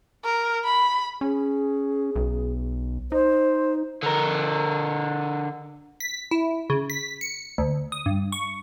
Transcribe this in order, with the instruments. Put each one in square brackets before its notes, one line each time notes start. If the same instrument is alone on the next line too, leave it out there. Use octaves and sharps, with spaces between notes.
[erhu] A#4
B5
[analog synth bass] C#4 [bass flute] G#4
[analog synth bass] B1
[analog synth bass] D#4 [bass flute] C5
[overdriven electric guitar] D3 A#4
[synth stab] B6
E4
C#3
B6
C#7
D2
D#6
G2
C#6